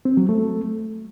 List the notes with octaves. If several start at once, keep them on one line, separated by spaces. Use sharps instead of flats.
C4
F#3
A3